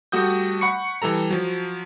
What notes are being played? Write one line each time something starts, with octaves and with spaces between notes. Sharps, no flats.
G3 A3 F#4 D#6 G6
F#5 B5 C#6 C#7
E3 G3 A4 A#5
F3 F#3